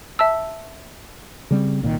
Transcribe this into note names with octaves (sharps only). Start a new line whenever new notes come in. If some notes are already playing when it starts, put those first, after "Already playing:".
E5 A5 E6
C#3 G3 C4
C2 A#2 D#3